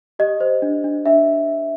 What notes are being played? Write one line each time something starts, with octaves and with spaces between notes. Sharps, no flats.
G4 D#5
C5
D4
D4
D4 E5